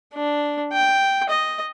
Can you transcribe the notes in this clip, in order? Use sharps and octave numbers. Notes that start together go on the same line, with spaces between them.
D4
G5
D#5